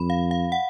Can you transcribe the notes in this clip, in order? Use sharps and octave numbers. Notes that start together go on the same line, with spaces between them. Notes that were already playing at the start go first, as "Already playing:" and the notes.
Already playing: F2 B5
F5
F5
F#5